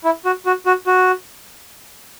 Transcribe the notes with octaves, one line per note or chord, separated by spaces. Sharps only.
E4
F#4
F#4
F#4
F#4